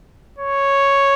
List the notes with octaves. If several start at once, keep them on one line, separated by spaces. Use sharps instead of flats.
C#5